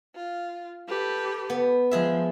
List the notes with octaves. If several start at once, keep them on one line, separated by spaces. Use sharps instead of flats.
F4
G4 A4 B4
B3
F3 G#3 G#4 E5